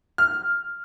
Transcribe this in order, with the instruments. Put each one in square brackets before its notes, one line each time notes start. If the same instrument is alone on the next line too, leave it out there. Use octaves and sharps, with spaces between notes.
[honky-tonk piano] F6